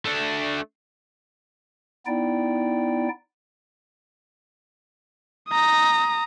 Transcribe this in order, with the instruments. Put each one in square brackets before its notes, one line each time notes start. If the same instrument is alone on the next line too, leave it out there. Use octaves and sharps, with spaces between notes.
[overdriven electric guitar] A3 D4
[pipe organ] B3 D#4 E4 D5 G5
[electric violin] A#5 D#6